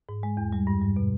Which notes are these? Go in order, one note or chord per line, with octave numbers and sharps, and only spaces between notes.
G#2
G#3
E2
G3
G2
G3
B2